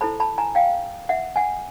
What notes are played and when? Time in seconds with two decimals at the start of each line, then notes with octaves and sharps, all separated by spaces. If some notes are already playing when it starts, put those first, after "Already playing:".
0.01 E4 A4 C5 A5 B5
0.20 A5 B5
0.38 G#5 A#5
0.55 F5 G5
1.09 E5 F#5
1.36 F#5 G#5